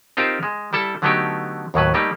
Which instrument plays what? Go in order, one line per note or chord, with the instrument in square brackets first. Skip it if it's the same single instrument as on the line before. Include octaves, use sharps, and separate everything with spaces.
[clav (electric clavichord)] C4 D#4 F4 G4 A#4 C5
G#3
G3 E4 A4 A5
D3 F#3 A3 B3 D#4 G4
D#2 A2 F#3 B4
G3 A3 A#3 D#4 G4